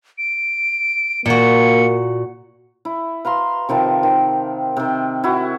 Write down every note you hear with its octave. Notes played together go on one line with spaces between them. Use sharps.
D7
A#2 A#3 F#4 C#7
E4
B4 F5 A#5 C6
C3 D#3 F3 A5
D#3
C3 D#3
E4 F#4